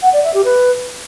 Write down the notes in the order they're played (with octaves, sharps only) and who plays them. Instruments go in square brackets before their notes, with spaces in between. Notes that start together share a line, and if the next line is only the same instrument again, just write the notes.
[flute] F#5
D5
E5
G4
B4